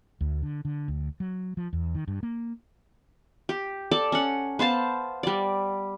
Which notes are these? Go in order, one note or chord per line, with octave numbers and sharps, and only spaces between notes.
D2
D3
D3
D2
F#3
F3
E2
D#3
G2
A#3
G4
A4 D5 A5
C#4 F#5
B3 C5 F5 A5
G3 D5